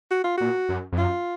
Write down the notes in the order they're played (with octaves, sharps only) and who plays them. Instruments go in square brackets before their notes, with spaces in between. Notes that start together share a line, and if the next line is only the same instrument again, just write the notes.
[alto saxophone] F#4
F4
[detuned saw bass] A#2 [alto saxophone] F#4
[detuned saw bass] F#2
F2
[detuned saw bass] F#2 [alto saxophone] F4